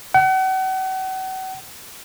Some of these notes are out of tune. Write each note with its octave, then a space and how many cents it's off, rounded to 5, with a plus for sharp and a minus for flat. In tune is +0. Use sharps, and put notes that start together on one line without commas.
F#5 +40